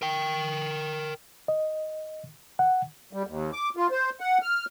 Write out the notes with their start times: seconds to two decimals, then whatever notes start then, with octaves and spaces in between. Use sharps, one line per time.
0.02 A#4 G5
1.48 D#5
2.59 F#5
3.13 G3
3.27 D#2
3.53 D6
3.77 F4
3.91 C5
4.20 F#5
4.42 F6